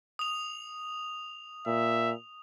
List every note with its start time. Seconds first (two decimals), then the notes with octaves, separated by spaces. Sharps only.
0.19 D#6 F7
1.67 A#2 E5